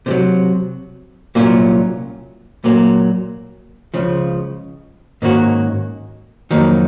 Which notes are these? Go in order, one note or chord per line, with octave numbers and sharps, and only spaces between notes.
C3 D#3 F#3
C2 A#2 F#3 C#4 F4
A#2 F#3 A#3
C#2 C#3 F3
G#2 D#3 A#3 C#4 F#4
F2 D#3 F#3 A#3